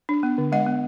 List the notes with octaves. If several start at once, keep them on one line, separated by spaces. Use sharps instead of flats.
D4
B3
D3
G#3 D#5 F#5
B3